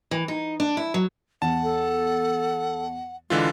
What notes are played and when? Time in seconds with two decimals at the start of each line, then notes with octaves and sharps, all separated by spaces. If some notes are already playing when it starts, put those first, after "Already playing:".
0.11 E3
0.28 D#4
0.60 D4
0.77 E4
0.94 F#3
1.42 E2 F#5 A5
1.63 A4
3.30 D3 E3 G#3 F4